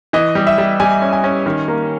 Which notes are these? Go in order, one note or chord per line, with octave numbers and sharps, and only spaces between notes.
E3 D#5
G3
E5
G3
G3 G#5
C#4
G#5
C#4
D#3
A#3